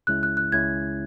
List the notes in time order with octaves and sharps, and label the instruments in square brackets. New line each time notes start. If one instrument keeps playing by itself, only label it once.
[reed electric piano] C#2 C#3 G#3 C#4 E4 [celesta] F#6
[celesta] F#6
F#6
[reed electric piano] C#2 C#3 G#3 C#4 E4 [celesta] G#6